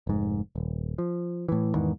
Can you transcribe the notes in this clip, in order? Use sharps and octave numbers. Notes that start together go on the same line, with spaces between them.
F1 G#2
D#1
F3
A2 E3
E2 G#2 D#3 E3